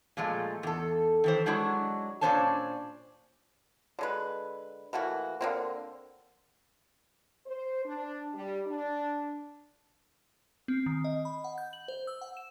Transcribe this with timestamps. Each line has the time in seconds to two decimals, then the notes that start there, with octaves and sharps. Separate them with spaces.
0.17 A#2 F3 G#3 A3
0.63 E2 A4
1.24 D#3 E3 C5
1.46 F#3 G#3 D4 E4 F#4
2.21 A#2 C#4 D4 C5 C#5 A5
3.99 D3 G#3 B4
4.93 E3 A3 A#3 F#4
5.41 D3 A#3 C4
7.46 C5
7.85 D4
8.33 G3
8.66 D4
10.68 C4
10.86 D#3
11.04 D#5
11.25 B5
11.44 F#5
11.58 G6
11.73 F#7
11.88 C5
12.07 E6
12.21 F#5
12.37 E7